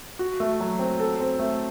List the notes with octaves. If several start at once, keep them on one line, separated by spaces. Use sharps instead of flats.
F#4
A3
F#3
C4
A4
C4
A3